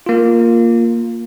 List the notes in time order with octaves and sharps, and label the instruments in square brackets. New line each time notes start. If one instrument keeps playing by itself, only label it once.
[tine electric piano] A#3 F4